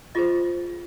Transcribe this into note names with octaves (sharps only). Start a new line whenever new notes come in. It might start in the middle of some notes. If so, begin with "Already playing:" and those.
F4 G#4 C5 D#5